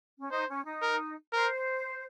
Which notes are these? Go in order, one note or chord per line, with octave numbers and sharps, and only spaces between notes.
C#4
D#4 C5
C#4
D#4
A#4
A#4 C5